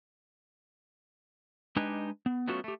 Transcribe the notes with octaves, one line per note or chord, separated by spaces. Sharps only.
G#3 D4 D#4 G4 B4 G#5
B3
F#3 A3 B3 C#4 F4 F#4
A3 G4